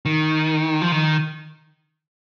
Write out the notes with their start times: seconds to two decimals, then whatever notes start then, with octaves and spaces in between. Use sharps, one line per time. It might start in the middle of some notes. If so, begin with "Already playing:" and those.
0.06 D#3
0.82 F3
0.92 D#3